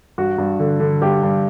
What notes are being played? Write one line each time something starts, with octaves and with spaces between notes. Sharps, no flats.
G2 F#4
G2
D3
D3
G2 G4
G2